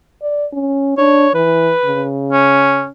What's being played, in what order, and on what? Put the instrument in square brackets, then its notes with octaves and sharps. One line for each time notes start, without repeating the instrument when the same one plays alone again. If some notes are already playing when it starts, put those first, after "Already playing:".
[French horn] D5
C#4
[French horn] D4 [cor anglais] C#5
[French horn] E3 [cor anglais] B4
[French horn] C#3
[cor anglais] C#4